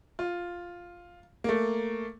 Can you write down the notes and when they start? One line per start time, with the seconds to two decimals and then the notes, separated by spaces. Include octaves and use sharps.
0.19 F4
1.44 A3 A#3